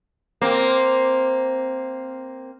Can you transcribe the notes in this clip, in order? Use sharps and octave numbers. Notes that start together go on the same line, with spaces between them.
A#3 C4